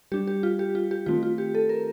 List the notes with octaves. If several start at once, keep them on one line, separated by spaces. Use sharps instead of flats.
G3 D4 G4
G4
F4
G4
F4
G4
D#3 A3 C4 F4
F4
G4
A4
A#4